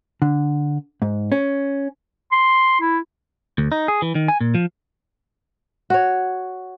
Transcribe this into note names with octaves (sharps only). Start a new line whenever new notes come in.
D3
G#2
C#4
C6
E4
D2
D#4
G#4
E3
D#3
G#5
A#2
F3
F#4 C#5